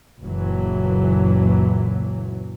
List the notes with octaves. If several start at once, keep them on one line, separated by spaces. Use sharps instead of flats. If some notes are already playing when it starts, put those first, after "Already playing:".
F#1 C#2 A#2 E3 F#3